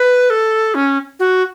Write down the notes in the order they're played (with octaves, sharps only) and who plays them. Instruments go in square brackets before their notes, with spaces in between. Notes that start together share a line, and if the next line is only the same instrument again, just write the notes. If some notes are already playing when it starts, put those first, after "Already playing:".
Already playing: [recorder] B4
A4
C#4
F#4